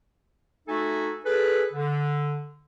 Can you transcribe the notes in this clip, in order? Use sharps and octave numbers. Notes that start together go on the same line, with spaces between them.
A3 D#4 F#4 A4 E5 G#5
G#4 A4 B4
D3